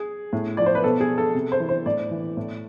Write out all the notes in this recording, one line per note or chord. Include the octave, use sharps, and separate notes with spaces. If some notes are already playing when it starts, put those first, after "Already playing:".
Already playing: G#4
A2
F3 D5
C5
B4
B2 A4
G#4
A4
C3
C5
E3
C5
A2 D5
E3
A2